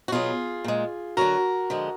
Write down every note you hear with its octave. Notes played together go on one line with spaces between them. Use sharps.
F#4
B2 F#3 F4 G#4
A#2 G#3
D3 F#3 F#4 A#4
D3 F3 G#3